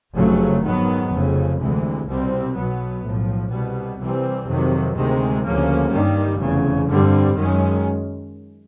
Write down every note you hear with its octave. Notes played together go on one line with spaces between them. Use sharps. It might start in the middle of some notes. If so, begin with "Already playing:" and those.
F1 F2 C#3 F#3 A3
G#2 D#3 F#3 B3
F1 F2 C#3
D2 C3 E3 G#3
C2 B2 G3 C4
B1 B2 F#3 B3
B1 A2 F3
C2 B2 G3 B3
C2 C3 E3 G3 C4
F2 C3 D#3 F#3
D2 C3 D#3 G#3 C4
D2 C#3 F3 A#3 C#4
G2 D#3 G3
F1 E2 C#3
G2 D3 G3 C4
F#2 D#3 G#3 C#4